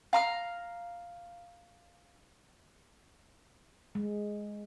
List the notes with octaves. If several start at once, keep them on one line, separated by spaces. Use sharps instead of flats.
F5 A#5 F6
G#3